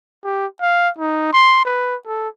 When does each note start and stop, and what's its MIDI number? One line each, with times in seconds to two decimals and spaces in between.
0.24 0.46 67
0.61 0.89 77
0.99 1.31 63
1.33 1.63 84
1.65 1.96 71
2.06 2.29 69